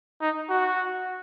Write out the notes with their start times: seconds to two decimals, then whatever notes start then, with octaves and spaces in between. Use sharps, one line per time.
0.21 D#4
0.50 F#4